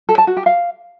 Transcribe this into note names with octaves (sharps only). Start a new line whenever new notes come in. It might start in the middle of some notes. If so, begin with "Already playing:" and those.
A4
A5
F#4
G4
F5